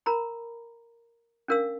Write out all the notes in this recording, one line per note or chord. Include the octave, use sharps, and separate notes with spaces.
A#4 A#5 B5
C#4 D4 A#4 F5 E6